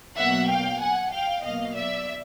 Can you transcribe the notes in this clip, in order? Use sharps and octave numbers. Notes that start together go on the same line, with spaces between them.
B2 F#3 A#3 E5 F#5
F5 G5
F#5 G#5
F5 G5
B2 F#3 A#3 D#5 F5
D5 E5